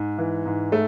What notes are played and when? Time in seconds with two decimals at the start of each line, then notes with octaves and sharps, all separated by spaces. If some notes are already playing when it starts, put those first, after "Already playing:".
Already playing: G#2
0.18 E3
0.46 G#2
0.72 A3